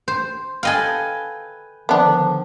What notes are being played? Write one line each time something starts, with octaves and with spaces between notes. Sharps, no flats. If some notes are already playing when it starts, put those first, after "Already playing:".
C5
A4 B4 D#5 F5 G5 G#5
D3 D#3 F3 B3 D4